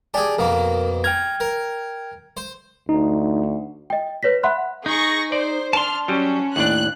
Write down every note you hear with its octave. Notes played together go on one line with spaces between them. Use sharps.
G4 G#4 D5 G#5 A5
F2 B2 A#3 A#4
G5 A#5 F6 G#6
A#4
C5
D2 D#4
D#5 G5
B4 C#5 A#6 B6
E5 F#5 B5 C6 F#6
D#4 G#4 C#6 A#6
C5 D5
D4 A5 C6 F6
F#3 G3 C#4
D#2 A2 D4 F#6